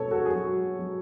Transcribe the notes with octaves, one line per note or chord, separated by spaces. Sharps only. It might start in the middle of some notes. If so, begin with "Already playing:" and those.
Already playing: B2 B3 A4 C#5
F#4 A4
G#4
F#3 F#4
F#3